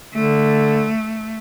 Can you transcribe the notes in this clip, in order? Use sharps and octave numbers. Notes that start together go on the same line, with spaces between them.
D3 A3